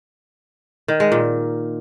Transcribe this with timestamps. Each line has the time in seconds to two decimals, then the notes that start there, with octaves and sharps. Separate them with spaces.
0.88 D#3
1.00 G#3
1.12 A#2